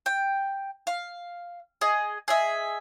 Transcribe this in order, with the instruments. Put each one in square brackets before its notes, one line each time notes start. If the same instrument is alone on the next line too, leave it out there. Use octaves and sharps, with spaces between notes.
[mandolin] G5
F5
G#4 D#5
G#4 D#5 E5